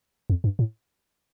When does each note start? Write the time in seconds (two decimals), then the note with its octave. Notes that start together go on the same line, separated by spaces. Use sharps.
0.30 F2
0.44 G2
0.59 A2